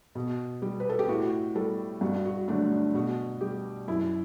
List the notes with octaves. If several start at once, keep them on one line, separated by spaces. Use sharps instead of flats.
B2
G3
B4
A4
G4
A2 F#4
G3 A4
G2 F#4
F#4
D3 F#3 A3 D4
D4
B2 F#4
G3 G4
F#2 E4